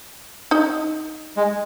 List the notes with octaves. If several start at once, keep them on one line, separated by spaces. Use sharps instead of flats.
D#4 D#5
G#3